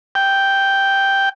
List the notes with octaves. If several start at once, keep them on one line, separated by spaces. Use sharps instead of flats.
G5